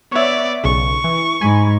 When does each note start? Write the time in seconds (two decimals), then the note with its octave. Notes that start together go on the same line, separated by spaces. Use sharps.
0.12 B3 C#5 D5 E5
0.64 B1 C#3 C#6
1.04 E3
1.41 G#2 G#5 B5